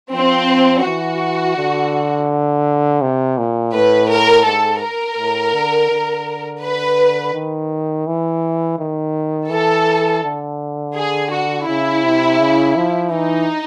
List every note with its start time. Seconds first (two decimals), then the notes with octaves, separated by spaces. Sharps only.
0.12 F3 C4
0.85 E3 F#4
1.57 D3
3.02 C3
3.38 A#2
3.73 A2 B4
4.10 A#4
4.46 G#2 A4
4.82 A#4
5.18 A2
5.53 D3
5.91 D3
6.62 B4
7.34 D#3
8.07 E3
8.79 D#3
9.50 E3 A4
10.23 D3
10.96 G#4
11.31 F#4
11.67 C#3 E4
12.04 C3
12.39 C#3
12.76 F3
13.11 E3 D#4